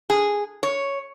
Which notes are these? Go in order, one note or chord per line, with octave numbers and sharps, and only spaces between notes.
G#4
C#5